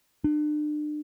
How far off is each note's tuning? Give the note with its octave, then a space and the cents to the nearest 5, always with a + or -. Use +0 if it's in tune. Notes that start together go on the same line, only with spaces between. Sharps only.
D4 +35